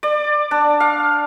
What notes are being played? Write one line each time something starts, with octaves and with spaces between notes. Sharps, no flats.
D5
D4
F5